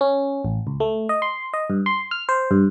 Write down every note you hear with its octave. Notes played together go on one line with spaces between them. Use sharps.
C#4
A1
C#2
A3
D#5
C6
D#5
G2
C6
F6
C5
G2